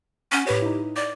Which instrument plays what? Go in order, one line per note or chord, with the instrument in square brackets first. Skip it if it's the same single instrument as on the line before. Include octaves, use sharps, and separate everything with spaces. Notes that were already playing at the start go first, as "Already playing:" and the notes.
[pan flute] C#4 [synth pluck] F#5 G#5 C#6
[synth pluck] A2 B4 C#5 [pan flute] G4
[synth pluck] D#4 E4
[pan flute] D5 [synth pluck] D6